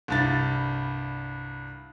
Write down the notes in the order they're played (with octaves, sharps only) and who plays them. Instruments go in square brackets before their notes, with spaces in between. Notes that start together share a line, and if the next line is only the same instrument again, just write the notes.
[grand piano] C2 G2 A6